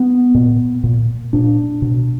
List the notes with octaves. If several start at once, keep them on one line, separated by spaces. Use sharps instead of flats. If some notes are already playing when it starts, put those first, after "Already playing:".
Already playing: B3
A#2
A#2
A#2 D4
B2